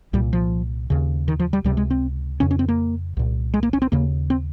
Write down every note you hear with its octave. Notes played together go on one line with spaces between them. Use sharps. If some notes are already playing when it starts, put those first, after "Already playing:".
C2 A#2 G3
F3
D#2 C#3
D#3
F3
G3
C#2 C3 G3
G#3
C4
F2 C#3 C#4
C#4
C4
A#3
C2 A#2
G#3
A#3
C#4
C4
D#2 C#3 A#3
C4